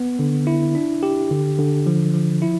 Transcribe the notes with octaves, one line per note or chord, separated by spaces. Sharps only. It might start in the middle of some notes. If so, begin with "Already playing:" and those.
Already playing: B3
D3
E4
D4
G4
D3
D3
F3
F3
E4